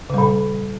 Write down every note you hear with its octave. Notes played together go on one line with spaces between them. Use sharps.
A#2 C#3 G3